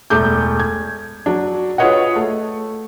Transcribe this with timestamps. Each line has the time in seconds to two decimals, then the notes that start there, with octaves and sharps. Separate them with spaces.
0.10 E1 A3 D6 G6
0.60 G#6
1.26 F#3 D4
1.78 F4 G#4 B4 C#5 D#5 F#5
2.16 A3